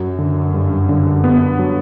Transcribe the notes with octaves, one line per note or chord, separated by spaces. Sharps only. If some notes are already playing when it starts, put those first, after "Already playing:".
Already playing: F#2 F#3
D3
G2
D3
B3
F#3